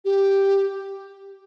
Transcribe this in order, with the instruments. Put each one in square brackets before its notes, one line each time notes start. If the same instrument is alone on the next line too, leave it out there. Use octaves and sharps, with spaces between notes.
[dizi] G4